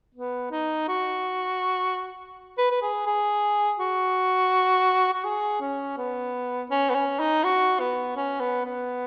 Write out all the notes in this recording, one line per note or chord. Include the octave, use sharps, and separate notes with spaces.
B3
D#4
F#4
B4
B4
G#4
G#4
F#4
F#4
G#4
C#4
B3
C#4
B3
C#4
D#4
F#4
B3
C#4
B3
B3